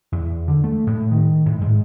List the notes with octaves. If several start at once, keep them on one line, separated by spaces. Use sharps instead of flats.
E2
D3
A3
A2
D#3
A2
G#2